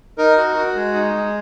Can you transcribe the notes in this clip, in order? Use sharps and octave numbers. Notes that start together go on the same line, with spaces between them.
D#4 A#4
F#4
F#4
G#3
D#4
G#3